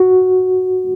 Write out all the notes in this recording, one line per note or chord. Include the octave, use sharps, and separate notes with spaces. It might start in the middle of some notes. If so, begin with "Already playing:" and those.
Already playing: F#4